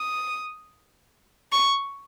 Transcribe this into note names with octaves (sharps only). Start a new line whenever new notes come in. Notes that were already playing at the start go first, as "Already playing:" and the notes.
Already playing: D#6
C#6